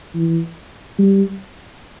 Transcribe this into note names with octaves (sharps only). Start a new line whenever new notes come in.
E3
G3